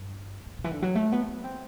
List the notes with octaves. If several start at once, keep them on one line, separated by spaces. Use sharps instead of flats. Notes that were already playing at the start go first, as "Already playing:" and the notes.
Already playing: G2
A2
B2
E3
D3
E3
F#3
A3
B3
B3
C4